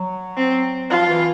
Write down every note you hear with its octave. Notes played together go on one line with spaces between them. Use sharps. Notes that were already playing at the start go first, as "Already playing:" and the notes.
Already playing: F#3
C4
F3 F4
E3